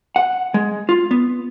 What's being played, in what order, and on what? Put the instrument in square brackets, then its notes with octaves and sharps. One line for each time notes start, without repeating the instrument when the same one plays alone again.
[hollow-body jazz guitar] F#5
G#3
F4
B3